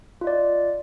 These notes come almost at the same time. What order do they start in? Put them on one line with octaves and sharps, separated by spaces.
F4 D#5 D5